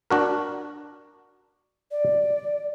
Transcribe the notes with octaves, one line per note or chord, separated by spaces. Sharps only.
D4 F#4 A#4
D5